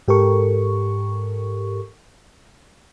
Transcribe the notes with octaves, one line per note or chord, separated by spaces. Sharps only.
G#2 G4 A4 A#4 C#6